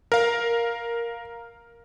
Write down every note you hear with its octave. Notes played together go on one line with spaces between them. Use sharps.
A#4 F5